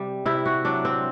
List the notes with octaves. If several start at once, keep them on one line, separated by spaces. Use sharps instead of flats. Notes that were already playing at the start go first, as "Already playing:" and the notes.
Already playing: C3 G3
C3 E4
F#4
F#3 D4
C4